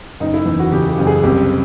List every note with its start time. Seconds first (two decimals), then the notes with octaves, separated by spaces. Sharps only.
0.20 F#1 D#4
0.34 E4
0.45 E2
0.60 F#4
0.72 C#3 G4
0.89 G4
0.98 F#1
1.07 G#4
1.23 C2 G4